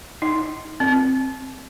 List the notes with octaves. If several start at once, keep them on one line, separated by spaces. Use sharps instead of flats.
D#4
C4